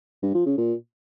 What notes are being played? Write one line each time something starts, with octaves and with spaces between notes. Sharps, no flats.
G2
F3
C#3
A#2